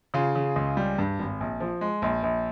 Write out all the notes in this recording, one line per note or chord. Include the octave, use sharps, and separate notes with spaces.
C#3 F4 G#4
C#3
C#2
G3
G2
G#1
A#1
F3
G#3
A#1
A#1